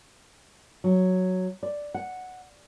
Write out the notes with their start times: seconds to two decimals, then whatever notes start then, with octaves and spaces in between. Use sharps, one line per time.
0.84 F#3
1.63 D5
1.94 F#5